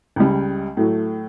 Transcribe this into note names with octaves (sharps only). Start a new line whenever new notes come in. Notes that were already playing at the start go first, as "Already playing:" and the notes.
C#2 C#3 G3
A2 F#3 A3